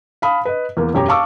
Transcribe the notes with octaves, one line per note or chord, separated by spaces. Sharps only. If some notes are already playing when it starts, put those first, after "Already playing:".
F5 A5 B5 D#6
B4 D#5
E2 A#3
E1 F#2 G4 C#5 A#5
F5 A5 C#6 D6 E6